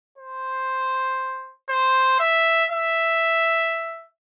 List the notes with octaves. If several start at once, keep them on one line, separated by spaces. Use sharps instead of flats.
C5
C5
E5
E5